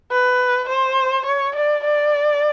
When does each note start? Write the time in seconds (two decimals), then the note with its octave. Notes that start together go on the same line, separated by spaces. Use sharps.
0.11 B4
0.69 C5
1.26 C#5
1.55 D5
1.84 D5